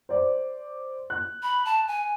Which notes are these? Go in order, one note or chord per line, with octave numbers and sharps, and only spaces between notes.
C5 D5
F#6
B5
A5
G#5